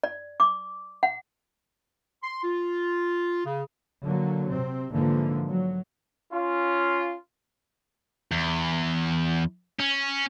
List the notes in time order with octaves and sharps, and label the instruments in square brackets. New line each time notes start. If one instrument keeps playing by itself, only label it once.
[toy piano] D5
D6
F#5
[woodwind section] C6
F4
C#3
[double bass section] D3 F#3 A#3
C3 C4
G#2 D3 E3 F3 A#3
F#3
[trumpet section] C#4 F4
[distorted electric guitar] E2
C#4